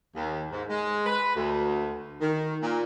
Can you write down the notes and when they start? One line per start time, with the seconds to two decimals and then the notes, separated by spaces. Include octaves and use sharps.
0.15 D#2
0.52 G#2
0.70 G#3
1.06 B4
1.36 D2
2.21 D#3
2.62 A#2